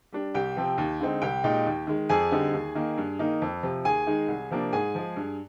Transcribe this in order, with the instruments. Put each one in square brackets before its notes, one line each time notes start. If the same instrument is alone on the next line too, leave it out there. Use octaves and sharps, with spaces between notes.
[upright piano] G3 D4
C2 G4 G5
C3 F3 C4
D#2
D3 G#3 C4 D#4
C2 G4 G5
A#2 G#3 D#4
D#2
D#3 G#3
F2 G#4 G#5
D3 G3 C4 D#4
D#2
D#3 A#3 D#4
G2
D#3 A#3 D#4
F2
C3 F3
D#2 G#4 G#5
D#3 G#3 D#4
C2
C3 F3 A#3 D4
G#2 G#4 G#5
F3 G#3
G2